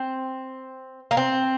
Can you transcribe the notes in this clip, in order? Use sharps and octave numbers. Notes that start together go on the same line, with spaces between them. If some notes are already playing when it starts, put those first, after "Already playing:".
Already playing: C4
A#3
C4